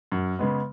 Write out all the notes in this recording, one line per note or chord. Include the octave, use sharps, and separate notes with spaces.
F#2
C#3 G#3 B3